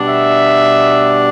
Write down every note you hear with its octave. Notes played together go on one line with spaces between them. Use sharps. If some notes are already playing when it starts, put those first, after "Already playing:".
Already playing: B2 G3 D4
E5